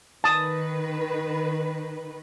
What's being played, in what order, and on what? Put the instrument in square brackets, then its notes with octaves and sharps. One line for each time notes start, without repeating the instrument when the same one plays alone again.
[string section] D#3 B4 [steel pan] A5 D#6